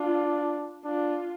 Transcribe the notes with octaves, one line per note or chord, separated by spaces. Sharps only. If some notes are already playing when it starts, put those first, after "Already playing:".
Already playing: D4 F4
D4 F4